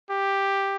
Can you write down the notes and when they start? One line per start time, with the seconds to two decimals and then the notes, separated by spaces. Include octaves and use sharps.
0.10 G4